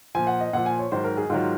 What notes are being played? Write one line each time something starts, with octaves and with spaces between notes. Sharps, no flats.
A#2 F3 G#5
F#5
D#5
A#2 F3 F#5
G#5
C#5
G#2 D#3 F#3 C5
A#4
G#4
G#2 D#3 F#3 F4